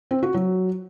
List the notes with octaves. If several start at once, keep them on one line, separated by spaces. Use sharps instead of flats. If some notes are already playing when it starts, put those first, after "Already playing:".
C4
F#4
F#3